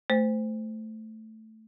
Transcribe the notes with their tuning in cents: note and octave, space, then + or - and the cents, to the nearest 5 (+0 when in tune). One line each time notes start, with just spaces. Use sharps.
A3 +0 C5 -15